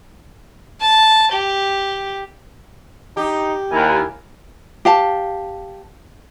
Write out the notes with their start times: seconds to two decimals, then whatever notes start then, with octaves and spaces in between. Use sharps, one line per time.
0.81 A5
1.33 G4
3.17 D#4 G4
3.72 D#2 E4 A#4 G#5
4.85 G4 F5 A5